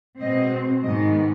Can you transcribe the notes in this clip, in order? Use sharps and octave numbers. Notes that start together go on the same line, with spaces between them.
B2 G#3 C4 D#5
G#2 D#3 B3 D#5